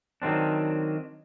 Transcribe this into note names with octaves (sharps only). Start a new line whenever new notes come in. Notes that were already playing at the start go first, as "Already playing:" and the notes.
D#3 F#3 C4 D4